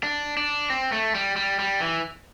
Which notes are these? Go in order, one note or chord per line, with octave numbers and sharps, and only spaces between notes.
D4
D4
C4
A3
G3
G3
G3
E3